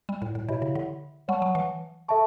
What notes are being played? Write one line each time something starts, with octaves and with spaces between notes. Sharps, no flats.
G3
A2
A2
B2 E4 G4 C#5 E5 B5
C#3
D3
G3 C#5 F#5 A5 C#6
F#3
E3
A4 E5 A5 C#6